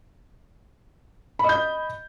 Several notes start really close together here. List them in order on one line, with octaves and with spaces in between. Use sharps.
B5 D#5 G6